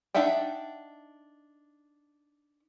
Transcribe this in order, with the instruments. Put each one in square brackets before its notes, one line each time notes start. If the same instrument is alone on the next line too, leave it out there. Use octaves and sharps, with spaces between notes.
[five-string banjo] D4 D#4 E5 F#5 G5